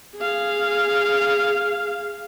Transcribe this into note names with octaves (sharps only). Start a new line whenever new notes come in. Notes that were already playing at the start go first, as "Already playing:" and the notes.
G#4 F5